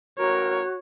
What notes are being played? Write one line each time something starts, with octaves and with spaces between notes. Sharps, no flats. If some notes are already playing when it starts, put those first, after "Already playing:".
A1 F#4 A#4 C#5